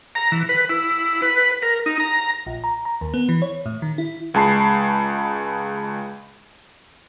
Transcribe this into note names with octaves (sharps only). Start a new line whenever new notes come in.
A#5
E3
B4
E4
B4
A#4
D#4
A#5
A#1
A#5
A#5
D#2
B3
E3
C#5
A2
D#3
E4
C#2 G#3 A5 B5 C7